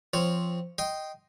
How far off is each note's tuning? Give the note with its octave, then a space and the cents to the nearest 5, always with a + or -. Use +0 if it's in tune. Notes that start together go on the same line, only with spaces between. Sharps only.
F3 -10 C4 +0 C#5 +0
D#5 +0 G5 -10 C6 +0